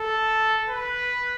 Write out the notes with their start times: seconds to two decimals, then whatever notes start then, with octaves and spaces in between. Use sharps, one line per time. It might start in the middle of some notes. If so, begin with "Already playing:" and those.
Already playing: A4
0.69 B4